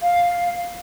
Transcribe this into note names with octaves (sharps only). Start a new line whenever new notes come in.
F5